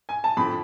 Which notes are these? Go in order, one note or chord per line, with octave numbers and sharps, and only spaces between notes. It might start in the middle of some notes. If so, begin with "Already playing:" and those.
G#5
A5
F2 D3 F3 B5